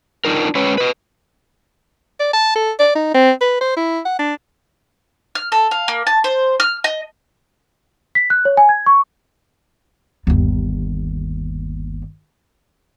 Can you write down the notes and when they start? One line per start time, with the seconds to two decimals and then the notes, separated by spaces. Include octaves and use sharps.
0.25 D4 D#4 F4 A#4
0.55 G#3 C#4 B4 C#5
0.78 B4 D#5
2.20 D5
2.34 A5
2.56 A4
2.79 D5
2.95 D#4
3.14 C4
3.41 B4
3.61 C5
3.77 E4
4.06 F#5
4.19 D4
5.35 F6
5.52 A4
5.71 F5
5.88 A#3
6.07 A5
6.24 C5
6.60 F6
6.84 D#5
8.15 B6
8.30 F#6
8.45 C#5
8.57 G#5
8.69 G#6
8.86 C#6
10.27 G1 D#2